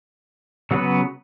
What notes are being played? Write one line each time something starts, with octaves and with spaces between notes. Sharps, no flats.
C#3 F#3 B3 F#4 B4